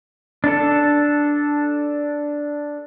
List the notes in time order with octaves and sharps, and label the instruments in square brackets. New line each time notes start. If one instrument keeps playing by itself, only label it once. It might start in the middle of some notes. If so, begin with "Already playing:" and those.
[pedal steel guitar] D4 A4